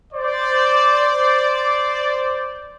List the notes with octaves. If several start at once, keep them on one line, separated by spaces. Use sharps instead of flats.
C5 D5